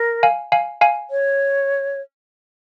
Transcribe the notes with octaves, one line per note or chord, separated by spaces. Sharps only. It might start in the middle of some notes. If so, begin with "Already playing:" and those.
Already playing: A#4
F5 G#5
F5 G#5
F5 G#5
C#5